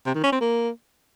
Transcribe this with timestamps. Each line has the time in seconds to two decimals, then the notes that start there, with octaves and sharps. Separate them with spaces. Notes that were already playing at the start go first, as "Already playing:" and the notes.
0.06 C3
0.15 D#3
0.23 C#4
0.32 C4
0.41 A#3